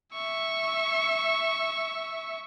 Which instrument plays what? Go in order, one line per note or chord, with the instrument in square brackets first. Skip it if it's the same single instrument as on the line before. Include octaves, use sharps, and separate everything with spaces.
[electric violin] E5 C#6